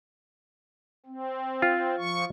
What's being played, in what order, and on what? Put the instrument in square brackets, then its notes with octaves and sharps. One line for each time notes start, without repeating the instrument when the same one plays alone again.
[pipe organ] C4
[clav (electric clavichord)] F4
[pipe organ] F3 C#6